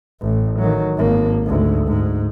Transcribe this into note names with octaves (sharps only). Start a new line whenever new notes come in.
A1
D#3 F#3
G#1 A#3
D2 G#2
G#2